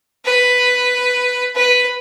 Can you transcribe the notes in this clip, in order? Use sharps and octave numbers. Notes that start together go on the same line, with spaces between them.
B4
B4